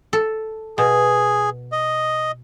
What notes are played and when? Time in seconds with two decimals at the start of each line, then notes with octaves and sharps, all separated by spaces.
0.13 A4
0.78 B2 G#4
1.72 D#5